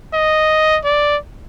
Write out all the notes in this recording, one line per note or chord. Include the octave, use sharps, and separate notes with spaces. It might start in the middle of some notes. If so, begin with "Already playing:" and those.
D#5
D5